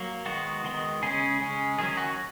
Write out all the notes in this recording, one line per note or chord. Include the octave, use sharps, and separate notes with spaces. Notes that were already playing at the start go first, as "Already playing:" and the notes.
Already playing: F#3 A#3
D#3 G#3 B3 F#4
D#3 G#3 B3
C#3 G#3 C#4 G#4
C#3 G#3 C#4
D#3 F#3 C#4 G#4
F#4